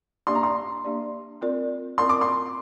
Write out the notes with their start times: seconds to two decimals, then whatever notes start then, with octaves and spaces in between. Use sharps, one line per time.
0.27 A#3 D4 G4 D5 C6
0.35 A#5
0.43 C6
0.84 A#3 D4 G4 D5
1.41 C4 F4 A#4 D5
1.98 C4 F4 A#4 D5 C6
2.09 D6
2.21 C6